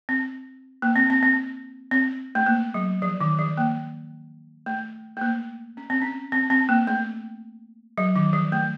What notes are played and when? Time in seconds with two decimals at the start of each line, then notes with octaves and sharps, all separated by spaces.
0.09 C4
0.82 A#3
0.96 C4
1.10 C4
1.23 C4
1.91 C4
2.35 A3
2.46 A#3
2.74 F#3
3.02 F3
3.21 D#3
3.39 F3
3.57 A#3
4.66 A3
5.17 A3
5.21 A#3
5.77 C#4
5.90 C4
6.02 C#4
6.32 C4
6.50 C4
6.69 A#3
6.87 A3
7.98 F#3
8.16 D#3
8.33 F3
8.52 A3